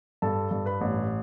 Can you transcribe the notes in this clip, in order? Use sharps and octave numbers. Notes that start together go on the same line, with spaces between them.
G2 A4 A5
G2
B4 B5
A1